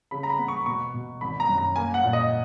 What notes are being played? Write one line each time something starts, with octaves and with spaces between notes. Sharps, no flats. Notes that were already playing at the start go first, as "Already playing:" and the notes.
C#3 B5
A#5
B5
B3
C#6
B2 C#6
B2
G#1 B5
A#5
F#2
A#5
A#3 G#5
F#5
A#2
D#5